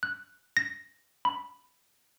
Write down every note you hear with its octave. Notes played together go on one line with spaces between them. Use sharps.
F#6
A#6
B5